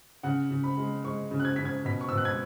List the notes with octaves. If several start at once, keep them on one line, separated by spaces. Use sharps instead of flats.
C#3 F#5
C#3
B5
G#3
G#3 C#6
C#3
F#6
G#6
C#3 B6
G#6
B2 B6
C#6
E6
B2 F#6
G#6